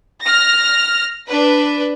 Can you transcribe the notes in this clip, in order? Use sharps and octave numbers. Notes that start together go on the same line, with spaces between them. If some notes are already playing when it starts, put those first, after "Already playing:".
F6 A#6
D4 B4